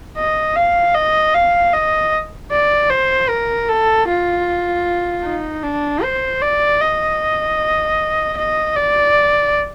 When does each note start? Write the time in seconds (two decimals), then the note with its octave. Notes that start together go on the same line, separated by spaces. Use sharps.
0.17 D#5
0.56 F5
0.95 D#5
1.34 F5
1.73 D#5
2.51 D5
2.90 C5
3.29 A#4
3.69 A4
4.08 F4
5.24 D#4
5.63 D4
6.03 C5
6.42 D5
6.81 D#5
8.37 D#5
8.76 D5